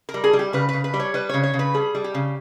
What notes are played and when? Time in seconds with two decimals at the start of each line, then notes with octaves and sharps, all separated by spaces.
0.09 A#4
0.14 G3
0.24 G#4
0.33 G3
0.39 G4
0.53 C#3 B4
0.69 C#3 B4
0.84 B4
0.94 G3
1.00 C#5
1.14 G3 B4
1.29 C#3 C#5
1.44 C#5
1.54 C#3
1.59 B4
1.74 G3 G#4
1.95 G3
2.04 G4
2.14 C#3